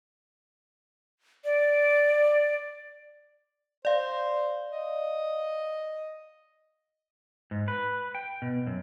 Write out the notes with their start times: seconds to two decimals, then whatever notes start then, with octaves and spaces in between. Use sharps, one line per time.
1.44 D5
3.85 C5 D5 F5
4.72 D#5
7.51 G#2
7.68 B4
8.15 G5
8.42 B2
8.67 F#2